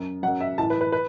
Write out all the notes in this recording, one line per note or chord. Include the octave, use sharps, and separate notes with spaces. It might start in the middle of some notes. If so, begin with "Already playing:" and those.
Already playing: F#2
F#2 F#3 F#5
E5
A2 E3 A5
B4
B4
B4